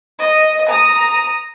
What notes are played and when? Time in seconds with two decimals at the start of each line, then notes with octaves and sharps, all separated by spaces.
0.19 D#5
0.69 A#5 D#6